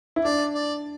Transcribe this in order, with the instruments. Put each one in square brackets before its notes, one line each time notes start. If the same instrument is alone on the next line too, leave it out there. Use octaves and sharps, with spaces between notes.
[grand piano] E4
[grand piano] D4 [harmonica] D5
[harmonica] D5